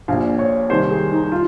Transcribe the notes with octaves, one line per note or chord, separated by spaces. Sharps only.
A#1 A#2 F5
C#5
C2 C3 D#3 C5
G#4
D#4
F4